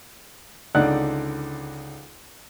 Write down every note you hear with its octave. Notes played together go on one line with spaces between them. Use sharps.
C#2 D3 D#4 D5 F#5 F#6